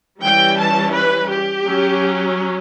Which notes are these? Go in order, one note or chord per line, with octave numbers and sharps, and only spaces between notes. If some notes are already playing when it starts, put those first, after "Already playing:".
E3 G3 C#4 G5
A5
B4
G4
F#3 C#4